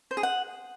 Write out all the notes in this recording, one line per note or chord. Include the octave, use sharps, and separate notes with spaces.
C5
G#4
F#5